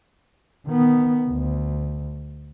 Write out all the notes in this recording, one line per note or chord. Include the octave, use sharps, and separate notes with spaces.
D#3 B3
D2